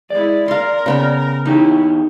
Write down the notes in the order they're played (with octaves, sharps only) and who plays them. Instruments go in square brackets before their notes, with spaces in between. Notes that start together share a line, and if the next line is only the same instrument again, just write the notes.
[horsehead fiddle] G#3 E4 [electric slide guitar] D5
[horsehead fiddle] A#4 [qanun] F5 C6
[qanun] C#3 B3 G5
[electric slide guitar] E2 G4 C#5 [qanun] D#4 [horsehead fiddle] E4